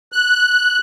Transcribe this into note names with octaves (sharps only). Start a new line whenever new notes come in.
F#6